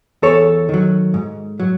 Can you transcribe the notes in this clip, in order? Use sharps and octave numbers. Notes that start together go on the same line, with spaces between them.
E2 A4 C#5
D#3 F#3
G#2
F#3